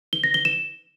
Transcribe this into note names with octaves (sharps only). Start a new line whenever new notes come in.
G7
A#6
G7
E7